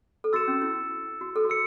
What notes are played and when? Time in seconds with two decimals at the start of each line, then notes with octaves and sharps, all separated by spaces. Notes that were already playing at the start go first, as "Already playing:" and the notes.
0.24 A4
0.33 F#4 E6 A6 C#7 E7
0.48 C#4
0.62 E4
1.21 F#4
1.36 A4
1.45 F#4
1.50 A4 E6 C#7